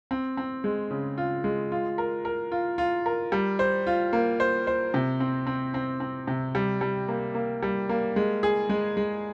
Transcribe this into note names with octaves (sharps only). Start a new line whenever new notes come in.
C4
C4
G#3
C#3
F4
G#3
F4
A#4
A#4
F4
F4
A#4
G3
C5
F4
A#3
C5
C5
C3
C4
C4
C4
C4
C3
G3
G3
A#3
A#3
G3
A#3
G#3
G#4
G#3
G#3